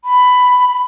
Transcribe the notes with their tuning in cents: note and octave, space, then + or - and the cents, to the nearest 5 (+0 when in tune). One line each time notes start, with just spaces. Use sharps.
B5 +10